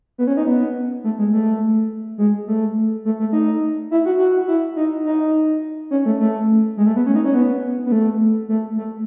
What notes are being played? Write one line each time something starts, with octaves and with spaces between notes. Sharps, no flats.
B3
C#4
D#4
B3
A3
G#3
A3
G#3
A3
A3
A3
D#4
E4
F#4
F#4
E4
D#4
D#4
C#4
A3
A3
G#3
A3
B3
C#4
D#4
C#4
B3
B3
A3
A3
A3